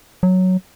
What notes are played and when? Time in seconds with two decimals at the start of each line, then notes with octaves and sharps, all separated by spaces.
0.23 F#3